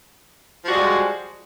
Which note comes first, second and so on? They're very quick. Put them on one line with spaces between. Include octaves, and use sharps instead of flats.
F3 F#4 G3 G#3